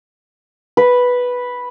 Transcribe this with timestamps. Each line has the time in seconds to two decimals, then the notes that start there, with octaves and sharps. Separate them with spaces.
0.77 B4